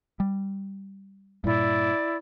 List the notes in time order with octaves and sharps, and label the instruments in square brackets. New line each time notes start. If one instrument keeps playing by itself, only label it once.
[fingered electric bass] G3
[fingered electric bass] G2 A#2 [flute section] E4 D5